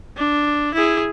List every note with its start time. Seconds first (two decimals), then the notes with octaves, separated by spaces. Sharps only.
0.17 D4
0.74 E4 G#4